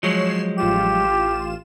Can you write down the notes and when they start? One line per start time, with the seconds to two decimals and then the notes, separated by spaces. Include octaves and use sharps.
0.03 F3 F#3 G#3 C#5 C7 E7
0.58 A1 F4 G4 E7